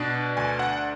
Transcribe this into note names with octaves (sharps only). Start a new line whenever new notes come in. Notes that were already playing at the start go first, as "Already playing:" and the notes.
Already playing: B2 D4
D2 G#5
F#5